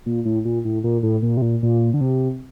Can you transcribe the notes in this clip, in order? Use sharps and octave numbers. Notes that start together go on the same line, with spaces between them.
A#2
A2
A#2
A2
A#2
A2
A#2
C3
A#2
A#2
D3
C3